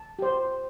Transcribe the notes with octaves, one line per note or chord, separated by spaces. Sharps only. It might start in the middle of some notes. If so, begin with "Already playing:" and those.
Already playing: A5
G4 C5